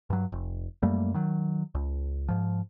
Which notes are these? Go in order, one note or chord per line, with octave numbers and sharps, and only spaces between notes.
G2 F#3
F1
F#2 G3 A3 A#3
D#3 F#3
C#2
G#2 F3